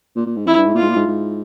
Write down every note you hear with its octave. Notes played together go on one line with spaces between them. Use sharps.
A#2
A#2
G#2
F2 E4
G2
G#2
A#2 F4
G#2
A#2
G#2
G#2